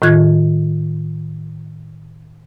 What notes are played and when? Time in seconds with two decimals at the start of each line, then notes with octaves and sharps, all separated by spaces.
0.02 A2 D#3 F4 F#6 G#6